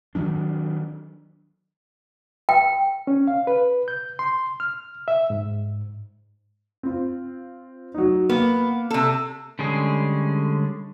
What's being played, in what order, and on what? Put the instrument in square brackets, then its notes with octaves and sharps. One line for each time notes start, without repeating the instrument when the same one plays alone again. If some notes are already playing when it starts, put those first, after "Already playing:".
[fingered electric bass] D#3 F3 F#3 D4
[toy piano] G5
[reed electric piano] C#4
F5
B4
G6
C6
F6
E5
G#2
[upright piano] C4 F4
F#3 D#4
[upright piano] A#3 [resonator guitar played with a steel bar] B3
[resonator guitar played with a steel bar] C3 A4
[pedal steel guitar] D3 G3 G#3 C#4 G#4